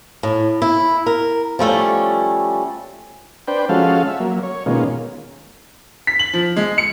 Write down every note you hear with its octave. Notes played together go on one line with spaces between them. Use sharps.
A2
E4
A#4
F3 G3 A3 C#4
D4 B4 C5 G5
F3 G#3 C#4 F#4 A4 F5
E5
F#3 A#3
C#5
B2 D#3 G#3 A#3 C#4 F4
B6
F#7
F3
G#3
C#7